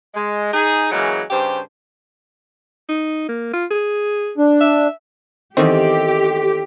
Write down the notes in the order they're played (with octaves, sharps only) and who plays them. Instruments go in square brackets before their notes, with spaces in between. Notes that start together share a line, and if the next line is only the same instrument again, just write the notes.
[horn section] G#3
D#4 G#4
C#3 E3 F#3 G#3 A#3
G2 C#3 G4 C5
[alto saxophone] D#4
A#3
F4
G#4
[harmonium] D4
[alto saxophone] E5
[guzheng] E2 D#3 [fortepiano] C4 [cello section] G4 [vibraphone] A4